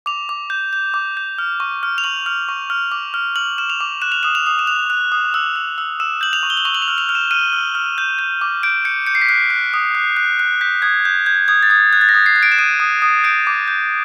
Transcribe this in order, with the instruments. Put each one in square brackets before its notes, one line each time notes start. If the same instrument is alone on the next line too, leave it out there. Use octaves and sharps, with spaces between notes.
[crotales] D6 F7
D6
G6
G6
D6
G6
F6
C#6
F6
F7
C#6 F#7
F6
C#6
F6
D6
F6
F6 F#7
F6 E7
F7
D6
F#6 E7
F7
D#6 E7
F7
D#6
E7
F#6 F7
F#6
D#6
E6
E6
E6
E6 E7
G6 F#7
F7
C#6
G7
F#7
C#6 F7
F#7
F7
F6
F7
F6
E7
F6 D#7
F6
F6
G6
G6
D6
G6 D7
G6 C#7
G6 C#7
C7
B6
F#6 C7
F#6
D#6
F#6
F#6
F#6
G6 B6
D#6 G#6
G6
G6 G#6
D#6 G#6
A6
D#6 G#6
F#6 G#6
A6
A#6
D#6
C7
F#6
D7
E7
D#6 D#7
D#6
D#6
G6 D7
D6
G6